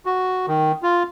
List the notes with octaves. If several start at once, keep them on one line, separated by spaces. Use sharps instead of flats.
F#4
D#3
F4